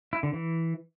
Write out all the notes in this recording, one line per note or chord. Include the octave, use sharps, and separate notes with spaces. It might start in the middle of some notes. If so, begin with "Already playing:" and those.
E4
D3
E3